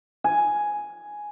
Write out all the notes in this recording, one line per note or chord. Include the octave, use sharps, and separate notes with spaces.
G#5